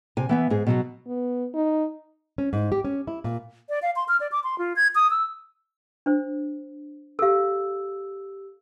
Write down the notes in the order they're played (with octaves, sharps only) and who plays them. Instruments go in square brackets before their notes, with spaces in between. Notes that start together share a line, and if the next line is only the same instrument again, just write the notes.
[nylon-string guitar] C3 G#5
E3 B3 E5
G#2 G#4
B2 F#3 F#4
[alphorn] B3
D#4
[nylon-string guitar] C#4
G#2
G4
C#4
E4
A#2
[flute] D5
F5
C6
F6
D5
D6
C6
F4
G#6
D#6
E6
[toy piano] D4 C5
[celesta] G4 E6 [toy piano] A4 F5